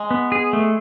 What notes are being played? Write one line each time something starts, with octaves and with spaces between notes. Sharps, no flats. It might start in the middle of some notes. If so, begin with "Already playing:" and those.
Already playing: G#3
B3
G#4
A3